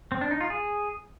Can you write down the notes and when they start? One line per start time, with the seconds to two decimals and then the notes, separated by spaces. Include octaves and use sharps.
0.12 C4
0.21 D4
0.31 D#4
0.41 F4
0.50 G#4